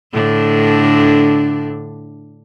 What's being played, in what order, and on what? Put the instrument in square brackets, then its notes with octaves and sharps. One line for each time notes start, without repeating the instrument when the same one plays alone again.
[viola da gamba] A2 D3 D4